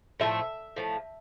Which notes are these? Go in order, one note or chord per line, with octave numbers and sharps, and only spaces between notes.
A2 F3 A3 E5
A2 F3 A3